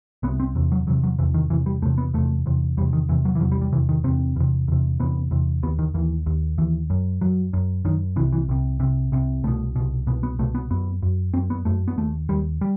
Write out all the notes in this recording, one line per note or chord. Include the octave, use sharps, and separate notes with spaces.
C2 C3 B3
C4
E2 C3
F#3
E2 C3 F#3
F#3
E2 C3 E3
D#3
E2 C3 E3
G3
E2 C3 A3
B3
E2 C3 A3
E2 C3
E2 C3 G3
D#3
E2 C3 E3
F#3
E3
E2 C3 F#3
G3
G3
E2 C3 E3
D#3
E2 C3 C4
E2 C3
E2 C3
E2 C3 B3
E2 C3
D#2 B3
D#3
D#2 E3
D#2
D#2 E3
F#2
F#2 F#3
F#2
F#2 D#3
C2 C3 E3
E3
C2 C3
C2 C3
C2 C3
C2 B2 A3
C2 B2
C2 B2 B3
B3
C2 B2 A3
B3
F#2 B3
F#2
F#2 C4
B3
F#2 A3
B3
D#2 A3
D#2 G3
G3